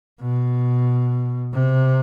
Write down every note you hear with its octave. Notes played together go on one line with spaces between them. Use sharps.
B2
C3